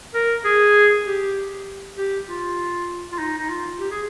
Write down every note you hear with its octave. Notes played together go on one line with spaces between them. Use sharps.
A#4
G#4
G4
G4
F4
F4
D#4
D#4
F4
G4
G#4